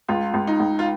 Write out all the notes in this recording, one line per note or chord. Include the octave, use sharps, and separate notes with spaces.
C#2 F4
C#2
D#4
C#2
F4